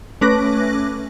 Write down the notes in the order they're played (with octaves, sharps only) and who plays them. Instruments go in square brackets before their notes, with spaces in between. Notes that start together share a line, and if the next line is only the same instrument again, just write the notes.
[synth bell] A3 C#4 B4 D6 F#6 A#6